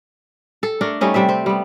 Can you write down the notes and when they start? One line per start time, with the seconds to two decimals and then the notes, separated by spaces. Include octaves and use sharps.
0.63 A4
0.81 A3 D4 A#4
1.01 G3 A3 C#4 D#4
1.14 C3 G3 C4 E5
1.29 C4
1.46 G3 B3